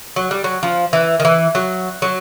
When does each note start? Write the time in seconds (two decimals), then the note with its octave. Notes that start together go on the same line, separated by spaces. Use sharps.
0.16 F#3
0.31 G3
0.44 F#3
0.63 F3
0.93 E3
1.20 D#3
1.25 E3
1.55 F#3
2.02 F#3